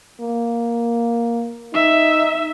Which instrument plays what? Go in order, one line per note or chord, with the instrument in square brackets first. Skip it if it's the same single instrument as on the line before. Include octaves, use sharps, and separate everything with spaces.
[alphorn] A#3
[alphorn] D#4 [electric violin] E5